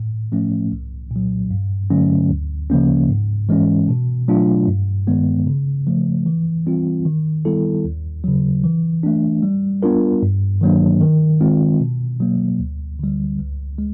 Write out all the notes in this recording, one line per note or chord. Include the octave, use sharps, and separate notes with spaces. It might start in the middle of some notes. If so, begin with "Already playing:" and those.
Already playing: A2
F3 A3 C#4
C2
A#2 F#3
G2
D3 F#3 A3 C#4
D2
C#3 F3 A#3 C#4
G#2
E3 G#3 C#4
B2
F#3 A3 D4 F4
G2
D#3 G#3 B3
C#3
F3 A3
E3
G3 C4 F4
D#3
G3 B3 E4 A4
D#2
C#3 F#3
E3
A3 D4
G3
B3 D4 F4 A#4
G2
D#3 F#3 A#3 D4
D#3
G#3 C4 F4
B2
F#3 A#3
D2
D3 G3
C#2
G#3